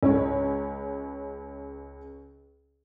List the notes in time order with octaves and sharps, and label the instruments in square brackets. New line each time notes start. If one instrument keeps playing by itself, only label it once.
[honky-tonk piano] C#2 C#5